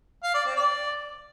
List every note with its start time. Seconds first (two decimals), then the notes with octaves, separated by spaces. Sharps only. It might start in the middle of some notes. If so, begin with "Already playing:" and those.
0.24 F5
0.34 D5
0.45 C4
0.56 D5